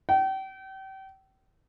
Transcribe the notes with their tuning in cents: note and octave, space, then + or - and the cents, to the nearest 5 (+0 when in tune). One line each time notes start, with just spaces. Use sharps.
G5 -35